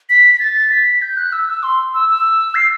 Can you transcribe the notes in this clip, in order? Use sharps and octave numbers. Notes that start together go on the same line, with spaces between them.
B6
B6
A6
B6
G6
F#6
E6
E6
C6
E6
E6
C7